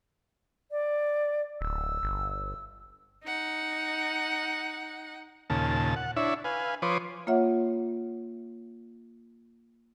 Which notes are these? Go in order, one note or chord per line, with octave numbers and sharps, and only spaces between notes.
D5
D1 E6
G1
D#4 F#5
D#2 A#2 C#3 A5
F#5
D4 E4 C#5 E5
B4 F5 G#5
F3 B4 C#5 C6 D6 D#6
A#3 F4 C#5 E5 F#5